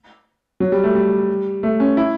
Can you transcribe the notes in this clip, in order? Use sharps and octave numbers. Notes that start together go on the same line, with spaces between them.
F#3
G3
A3
G3
A3
C#4
E4